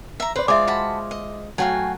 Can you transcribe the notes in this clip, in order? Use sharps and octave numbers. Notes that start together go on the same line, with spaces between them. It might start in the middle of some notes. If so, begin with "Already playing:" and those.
E5 A#5
B4 C5 D5
G#3 F4 C5 D5 E5 G#5 D6
F#4 A5 B5
D#5
F#3 A3 F#4 F5 G5 G#5